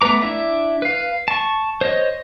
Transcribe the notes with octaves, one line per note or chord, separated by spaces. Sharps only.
A3 B3 B4 A#5 D6
D4 E4 E5
B4 F5
A5 C#6
C5 C#5 D#5